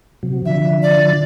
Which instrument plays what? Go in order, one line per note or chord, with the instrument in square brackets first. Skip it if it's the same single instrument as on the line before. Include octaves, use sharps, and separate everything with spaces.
[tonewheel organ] C3 F#3
[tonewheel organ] D3 F3 [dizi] E5
[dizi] D5